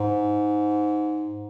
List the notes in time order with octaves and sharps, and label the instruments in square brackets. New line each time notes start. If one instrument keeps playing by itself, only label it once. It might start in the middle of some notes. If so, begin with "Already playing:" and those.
Already playing: [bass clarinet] G#2